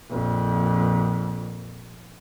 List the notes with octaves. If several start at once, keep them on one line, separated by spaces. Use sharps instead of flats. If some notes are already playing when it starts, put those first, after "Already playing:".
A#1 F2